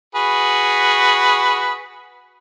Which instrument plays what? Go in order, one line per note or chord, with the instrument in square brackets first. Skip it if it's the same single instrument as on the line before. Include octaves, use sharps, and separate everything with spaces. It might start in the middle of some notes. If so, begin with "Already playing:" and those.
[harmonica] F#4 G#4 B4